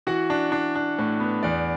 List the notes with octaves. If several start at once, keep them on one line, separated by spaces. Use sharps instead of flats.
E3 F#4 F#5
D4
D4
D4
A2
B3
E2 D5